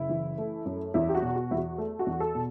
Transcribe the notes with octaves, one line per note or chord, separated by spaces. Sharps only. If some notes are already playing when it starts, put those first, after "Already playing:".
Already playing: F#1 E4
E3
A3
F#2
E2 E4
G4
F#4
B2
F#4
E2 E4
F#4
A3
F#4
E2
A4
B2